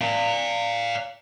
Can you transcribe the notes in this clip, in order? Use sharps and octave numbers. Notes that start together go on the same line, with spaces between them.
D5 F5